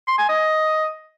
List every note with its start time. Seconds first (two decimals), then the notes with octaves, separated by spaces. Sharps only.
0.07 C6
0.18 G#5
0.29 D#5